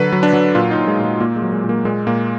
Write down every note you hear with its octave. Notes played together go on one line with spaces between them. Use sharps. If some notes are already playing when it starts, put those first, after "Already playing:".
Already playing: D3 F#3 B4
F#3
D4
F#3
A#2 F4
D#4
A#2
G#3
A#2
G#3
A#2 A#3
G#3
F#3
G#3
A#2
A#3
A#2 G#3
A#2 A#3